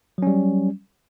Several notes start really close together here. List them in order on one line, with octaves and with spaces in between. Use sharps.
F#3 C#4 G3